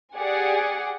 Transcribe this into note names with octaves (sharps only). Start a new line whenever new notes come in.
G4 G#4 D5 F#5 G#5